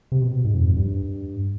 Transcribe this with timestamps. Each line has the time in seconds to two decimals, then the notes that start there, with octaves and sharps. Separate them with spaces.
0.12 C3
0.22 B2
0.44 G#2
0.54 F2
0.77 G2